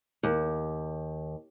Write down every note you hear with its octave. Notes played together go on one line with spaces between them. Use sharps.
D#2